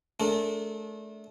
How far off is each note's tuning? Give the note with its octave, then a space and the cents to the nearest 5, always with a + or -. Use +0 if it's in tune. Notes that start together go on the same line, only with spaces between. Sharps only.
A3 -30 D4 -35 A#4 -45